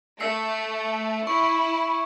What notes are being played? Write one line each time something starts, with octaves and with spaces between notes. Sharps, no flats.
A3 E6 C7 C#7
E4 C#6